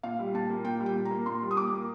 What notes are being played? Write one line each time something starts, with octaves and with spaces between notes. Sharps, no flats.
A#2 F5
G3
A#2 A5
A#3
A#2 G5
G3
G5
A#2
A#5
A#3
A#2 C6
G3
D#6
A#2 D6
A#3